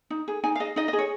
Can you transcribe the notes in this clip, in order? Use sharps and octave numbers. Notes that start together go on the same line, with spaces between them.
D#4
G#4
D#4 G#5
F5
G#4 D#5
D#4 D#5
D#5
G#4
C#5